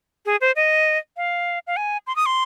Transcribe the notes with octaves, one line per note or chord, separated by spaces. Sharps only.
G#4
C5
D#5
F5
F5
G#5
C6
D#6
C6